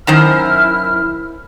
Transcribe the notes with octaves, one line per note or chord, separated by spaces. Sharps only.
F#2 D#3 E4 C5 F6